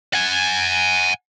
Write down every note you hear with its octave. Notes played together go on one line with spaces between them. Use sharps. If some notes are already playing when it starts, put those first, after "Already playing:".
F#5 G#5